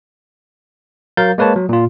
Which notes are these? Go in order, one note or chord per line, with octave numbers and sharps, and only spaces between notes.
F#3 A#4 F5 G6 A6
G#3 A#3 B4 C#5 A5
F#3
A#2 F4